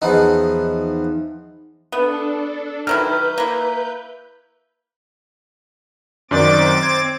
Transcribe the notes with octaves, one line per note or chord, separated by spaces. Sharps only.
E2 F3 B3 D#4
B3 D4 A4
D#3 F#3 E4 B4 F6 G6
A#3 E4
F#2 D#3 C4 D5 D6 A6
G#6